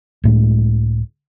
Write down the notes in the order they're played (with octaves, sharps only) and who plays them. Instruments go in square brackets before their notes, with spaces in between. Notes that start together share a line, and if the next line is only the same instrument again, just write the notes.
[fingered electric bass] C#2 A2 G#3